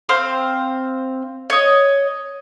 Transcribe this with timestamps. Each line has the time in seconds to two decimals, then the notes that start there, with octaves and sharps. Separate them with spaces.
0.09 C4 C5 F5
1.50 C#5 D#5